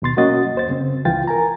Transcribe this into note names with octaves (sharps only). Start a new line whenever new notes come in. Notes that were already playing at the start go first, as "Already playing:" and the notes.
D#2 B2 C6 A6
F#3 A#3 C#4 F#4 D#5 A6
D#2 C5 A6
F#2 C#3 C4
C#2 E3 F4 G5 A6
A#4 G#5 A#5